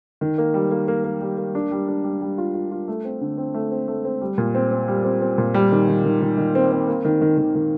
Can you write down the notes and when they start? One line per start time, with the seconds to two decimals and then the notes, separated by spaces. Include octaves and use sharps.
0.21 D#3
0.38 A#3
0.54 G3
0.71 A#3
0.88 A#3
1.04 A#3
1.21 G3
1.38 A#3
1.55 D4
1.71 G3
1.88 D4
2.04 G3
2.21 G3
2.38 F4
2.54 F4
2.71 F4
2.88 A3
3.04 C4
3.21 D3
3.38 C4
3.54 A3
3.71 C4
3.88 A3
4.05 C4
4.21 G3
4.38 A#2
4.55 C4
4.71 C4
4.88 G3
5.04 C4
5.21 C4
5.38 A#2
5.54 G3
5.71 D#3
5.88 D#3
6.05 D#3
6.22 D#3
6.38 D#3
6.55 C4
6.72 C4
6.88 A#3
7.05 D#3
7.21 D#3
7.38 D#3
7.55 D#3